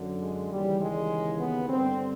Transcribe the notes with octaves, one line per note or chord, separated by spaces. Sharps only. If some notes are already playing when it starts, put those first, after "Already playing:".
Already playing: F#2 D3
G#3
D#2 C#3 E3 G3
G#3
B3
G2 D3 C4